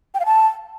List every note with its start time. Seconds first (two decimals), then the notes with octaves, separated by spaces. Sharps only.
0.14 G5
0.20 F5
0.26 A5